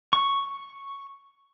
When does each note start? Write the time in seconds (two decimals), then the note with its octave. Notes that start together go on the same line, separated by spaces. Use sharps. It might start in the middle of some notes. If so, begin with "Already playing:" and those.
0.13 C#6